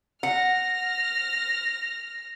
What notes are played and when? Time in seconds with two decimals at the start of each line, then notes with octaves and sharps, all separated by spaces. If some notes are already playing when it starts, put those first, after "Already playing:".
0.23 F#5 F6 A#6